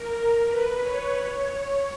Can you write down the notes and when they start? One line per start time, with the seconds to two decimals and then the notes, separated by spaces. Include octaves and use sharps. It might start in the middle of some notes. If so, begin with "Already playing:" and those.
Already playing: A#4
0.11 A#4
0.46 B4
0.80 C#5
1.15 C#5
1.50 C#5